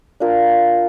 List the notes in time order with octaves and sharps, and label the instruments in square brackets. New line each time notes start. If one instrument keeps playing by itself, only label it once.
[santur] D4 F4 A#4